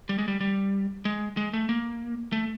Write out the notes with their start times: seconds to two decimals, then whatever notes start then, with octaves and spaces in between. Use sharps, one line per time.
0.09 G3
0.18 G#3
0.28 G3
0.41 G3
1.05 G#3
1.37 G#3
1.53 A3
1.69 A#3
2.32 A3